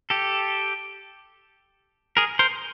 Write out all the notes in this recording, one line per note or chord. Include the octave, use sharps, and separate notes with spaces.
G4 A4
G#4 A#4
A#4 C5